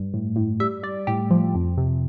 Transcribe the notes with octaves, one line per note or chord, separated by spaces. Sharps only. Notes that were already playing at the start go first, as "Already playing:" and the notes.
Already playing: G2
A2
A2
G3 E5
G3 D5
A2 G4
F3
F2
C3